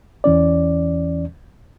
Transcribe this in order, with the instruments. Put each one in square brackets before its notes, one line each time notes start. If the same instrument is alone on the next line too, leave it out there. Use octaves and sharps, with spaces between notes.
[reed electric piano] E2 E3 C#4 D5